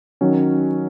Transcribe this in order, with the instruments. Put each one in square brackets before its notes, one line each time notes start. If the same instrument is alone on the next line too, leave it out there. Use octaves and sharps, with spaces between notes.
[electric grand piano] D#3 F#3 C#4